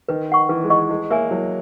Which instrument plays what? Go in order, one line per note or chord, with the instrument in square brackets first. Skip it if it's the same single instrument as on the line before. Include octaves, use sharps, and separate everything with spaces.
[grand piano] D#3 [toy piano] B4
[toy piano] D#5 F#5 C#6
[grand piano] E3 [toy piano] B4
[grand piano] G#3
[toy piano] D#5 F#5 C#6
[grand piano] G#3 [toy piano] E4
[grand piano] A#3 [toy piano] A#4 C#5 E5 G#5
[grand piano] F#3 [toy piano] E4